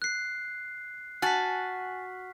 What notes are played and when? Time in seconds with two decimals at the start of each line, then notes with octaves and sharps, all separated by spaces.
0.02 F#6 C7
1.22 F#4 G#5 A5 F6 B6